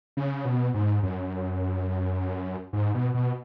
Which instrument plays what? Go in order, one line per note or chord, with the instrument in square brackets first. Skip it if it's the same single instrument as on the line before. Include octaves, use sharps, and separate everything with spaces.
[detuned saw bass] C#3
B2
G#2
F#2
G#2
B2
B2